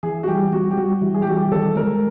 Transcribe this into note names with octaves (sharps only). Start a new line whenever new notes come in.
E3 G#4
F#4
G3 G4
G3 F#4
G4
G3 F#4
E3
G#4
G4
G3 F#4
G4
D#3 A4
G#3 A#4